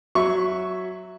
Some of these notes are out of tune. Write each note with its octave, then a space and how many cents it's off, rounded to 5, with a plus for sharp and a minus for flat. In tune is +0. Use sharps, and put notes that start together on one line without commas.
F#3 +0 E5 +0 C#6 +0